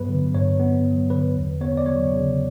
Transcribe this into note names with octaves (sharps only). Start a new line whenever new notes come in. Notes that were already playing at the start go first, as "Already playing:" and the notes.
Already playing: G2 F#3 B3 B4
D3
G2 C#5
B3
F#3
D3 B4
E2
B3 C#5
D5
F#3 C#5
C#3